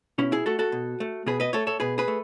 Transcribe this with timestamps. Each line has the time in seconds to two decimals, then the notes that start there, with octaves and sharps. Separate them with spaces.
0.18 B2 C#4 E4
0.32 E4 G#4
0.46 A3 F#4 A4
0.59 F#4 A4
0.72 B2
1.00 A3
1.27 B2 G#4 B4
1.40 B4 D#5
1.53 A3 A4 C#5
1.67 A4 C#5
1.80 B2 G#4 B4
1.98 G#4 B4
2.08 A3